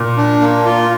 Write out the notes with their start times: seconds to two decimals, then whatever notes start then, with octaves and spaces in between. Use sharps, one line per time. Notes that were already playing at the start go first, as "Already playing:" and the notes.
Already playing: A#2
0.17 D4
0.41 A#3
0.66 F4